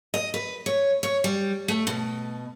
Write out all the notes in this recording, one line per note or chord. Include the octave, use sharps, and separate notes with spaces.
D#5
B4
C#5
C#5
G3
A3
B2